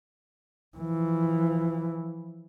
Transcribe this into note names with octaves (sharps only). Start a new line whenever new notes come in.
E3 F3